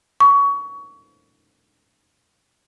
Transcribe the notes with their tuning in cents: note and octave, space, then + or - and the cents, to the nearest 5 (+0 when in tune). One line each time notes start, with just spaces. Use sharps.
C#6 +25